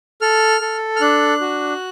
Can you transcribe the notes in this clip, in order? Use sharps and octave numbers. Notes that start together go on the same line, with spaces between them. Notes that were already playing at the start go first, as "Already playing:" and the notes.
A4 F6
A4
F6
D4 F#6
F#4